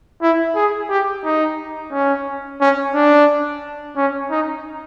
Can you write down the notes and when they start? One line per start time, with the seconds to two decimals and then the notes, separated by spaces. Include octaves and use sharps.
0.22 E4
0.55 G#4
0.89 G4
1.24 D#4
1.92 C#4
2.61 C#4
2.94 D4
3.96 C#4
4.31 D#4